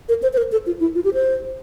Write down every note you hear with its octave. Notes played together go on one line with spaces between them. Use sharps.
A#4
C5
C5
A#4
A4
F4
E4
F4
G4
C5